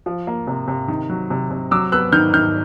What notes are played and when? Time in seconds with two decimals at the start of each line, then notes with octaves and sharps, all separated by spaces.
0.06 F3
0.27 A#3
0.47 C3
0.68 C3
0.88 D#3
1.10 F#3
1.30 C3
1.51 C3
1.71 F#3 D6 E6
1.92 B3 E6 F#6
2.12 D#3 F6 G6
2.34 D#3 F6 G6